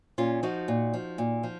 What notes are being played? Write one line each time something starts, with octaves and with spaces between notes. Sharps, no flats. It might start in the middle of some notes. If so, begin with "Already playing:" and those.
A#2 C#4 F4
F3 D#4 F#4
A#2
F3
A#2
F3